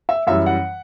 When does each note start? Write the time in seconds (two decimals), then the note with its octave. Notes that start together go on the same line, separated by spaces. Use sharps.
0.09 E5
0.27 F#2 E3 G3 E5
0.46 F#5